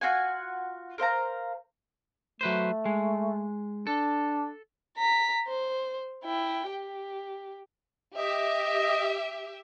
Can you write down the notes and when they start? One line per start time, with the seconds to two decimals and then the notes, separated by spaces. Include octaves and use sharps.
0.01 F4 F#4 F#5 G#5
0.98 A#4 C5 F5 A#5
2.41 F#3 A3 B4 C5
2.85 G#3
3.87 D4 A4
4.98 A#5 B6
5.48 C5
6.24 E4 G5
6.69 G4
8.16 G4 D#5 E5